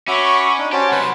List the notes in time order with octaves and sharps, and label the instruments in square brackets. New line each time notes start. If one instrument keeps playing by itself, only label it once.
[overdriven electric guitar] C#4 [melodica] F#4 C#5 E5 [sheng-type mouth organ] B5 C#6 D6
[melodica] D4 D#4
[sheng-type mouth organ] C#4 A5 [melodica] F#4 C5 [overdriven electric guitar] G4
[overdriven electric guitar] C3 F#3 [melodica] B4 C5 F#5